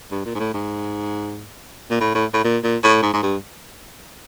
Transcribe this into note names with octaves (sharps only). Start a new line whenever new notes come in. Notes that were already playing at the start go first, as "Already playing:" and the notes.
G2
A#2
G#2
A2
G#2
A#2
A2
A2
A2
A#2
A#2
A2
G#2
G#2
G2